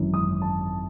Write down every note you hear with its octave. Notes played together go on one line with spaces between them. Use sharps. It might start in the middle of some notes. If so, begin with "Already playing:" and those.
Already playing: G#1 F#2 E3
D#6
A5